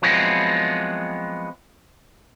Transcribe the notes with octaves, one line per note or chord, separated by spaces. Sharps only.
F3 F#3 G#3 B3 C4 E4